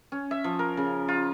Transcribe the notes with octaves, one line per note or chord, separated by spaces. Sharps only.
C#4
E5
F3
A#4
C#3
F4